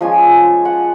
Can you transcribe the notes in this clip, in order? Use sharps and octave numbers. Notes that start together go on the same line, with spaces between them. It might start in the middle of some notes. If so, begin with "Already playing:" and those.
F3 G#3 C#4 F4 G#5
F#5